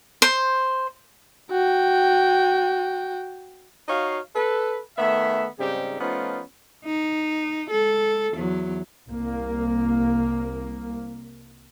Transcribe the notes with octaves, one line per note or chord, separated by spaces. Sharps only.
C5
F#4 G5
D#4 F#4 C#5 F5
A4 B4
D#3 A3 B3 E5
G#2 C#3 G3 C4 D#4 G4
F3 A3 B3 C#4 D#4 F4
D#4
G#3 A4
E2 F#3
C2 A#3